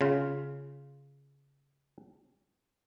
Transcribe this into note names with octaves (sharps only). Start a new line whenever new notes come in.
C#3 F4